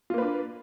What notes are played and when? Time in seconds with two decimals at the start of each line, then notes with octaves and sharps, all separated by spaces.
0.10 F4
0.14 A#3
0.18 B4
0.22 D4